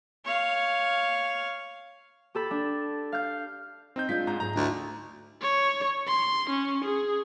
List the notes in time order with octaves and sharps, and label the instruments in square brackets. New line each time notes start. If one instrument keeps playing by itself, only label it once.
[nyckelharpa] C#5 F5
[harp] G4 A4 B5
D4
F5 F6 G6
[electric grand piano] C4 D#4 G6
[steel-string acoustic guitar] G#3 D4 F4 [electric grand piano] G6 B6
[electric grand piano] G#2 A#5 G6
[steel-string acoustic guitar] G#2 G#4 [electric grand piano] A#5
[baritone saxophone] D2 [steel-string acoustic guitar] D#4 E4
[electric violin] C#5
C6
C#4
G#4